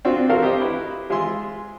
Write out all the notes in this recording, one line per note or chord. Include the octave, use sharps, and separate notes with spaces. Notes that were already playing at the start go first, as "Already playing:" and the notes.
C4 D4 F4 F#4
F4 F#4 A4 A#4 F5
G4 C5 D#5
E4 B4
G#3 F4 G#4 E5 C6